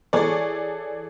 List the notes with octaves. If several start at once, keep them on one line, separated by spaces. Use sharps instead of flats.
E3 G#4 A4 C#5 D5